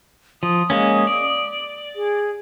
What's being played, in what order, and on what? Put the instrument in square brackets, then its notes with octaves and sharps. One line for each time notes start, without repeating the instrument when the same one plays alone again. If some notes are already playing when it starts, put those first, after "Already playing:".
[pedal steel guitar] F3 [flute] D#6
[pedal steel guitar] G#3 A#3 C#4
D5
[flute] G#4